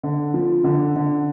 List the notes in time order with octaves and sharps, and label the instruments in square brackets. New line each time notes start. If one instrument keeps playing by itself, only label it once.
[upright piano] D3
F3
D3
D3